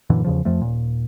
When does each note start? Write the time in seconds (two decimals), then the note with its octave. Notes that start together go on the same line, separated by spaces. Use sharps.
0.10 F#2 A#2 D3 E3
0.24 E2 C#3 F3
0.45 F2 F3 A3
0.61 D#1 A#2